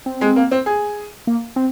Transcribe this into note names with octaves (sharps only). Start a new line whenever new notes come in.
C4
G#3
A#3
C4
G#4
A#3
C4